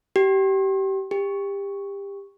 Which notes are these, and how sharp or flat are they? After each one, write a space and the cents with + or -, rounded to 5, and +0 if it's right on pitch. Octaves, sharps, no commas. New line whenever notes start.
G4 -25
G4 +25